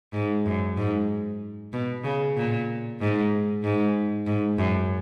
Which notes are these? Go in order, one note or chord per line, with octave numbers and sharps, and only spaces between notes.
G#2
F#2
G#2
B2
C#3
A#2
G#2
G#2
G#2
F#2